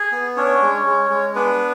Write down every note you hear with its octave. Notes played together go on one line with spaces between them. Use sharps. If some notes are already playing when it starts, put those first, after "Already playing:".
Already playing: G#4 G#5
B3
C#4 D4 C#5
G#3
G#3
G#3
B3 D4 B4